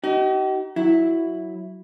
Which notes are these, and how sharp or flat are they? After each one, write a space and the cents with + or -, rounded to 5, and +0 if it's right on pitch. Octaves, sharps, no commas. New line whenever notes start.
D#4 +10 G4 -45
F#3 +0 E4 +0